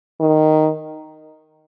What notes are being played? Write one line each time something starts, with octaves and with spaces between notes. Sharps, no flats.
D#3